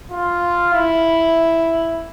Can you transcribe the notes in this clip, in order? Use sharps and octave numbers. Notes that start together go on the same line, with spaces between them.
F4
E4